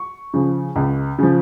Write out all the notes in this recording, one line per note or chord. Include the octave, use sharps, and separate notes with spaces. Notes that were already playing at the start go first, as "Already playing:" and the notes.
Already playing: C#6
C#3 F3
C#2
C#3 F3